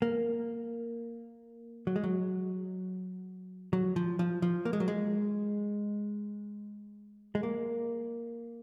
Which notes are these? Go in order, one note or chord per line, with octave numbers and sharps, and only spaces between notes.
A#3
F#3
G#3
F#3
F#3
F3
F3
F3
A#3
G#3
F#3
G#3
G#3
A#3